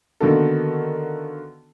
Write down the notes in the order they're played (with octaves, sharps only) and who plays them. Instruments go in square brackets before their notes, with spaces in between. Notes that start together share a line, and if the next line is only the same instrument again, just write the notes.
[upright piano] D3 D#3 A#3 B3 F#4 A4